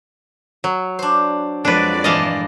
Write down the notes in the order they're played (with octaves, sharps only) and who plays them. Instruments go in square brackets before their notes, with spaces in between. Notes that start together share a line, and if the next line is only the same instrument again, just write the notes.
[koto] F#3
[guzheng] D4 C5
[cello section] F2 G#3 D5 [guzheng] F#3 [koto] D4 B4
[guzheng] G2 A#2 E3 [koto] D#5 F5 A5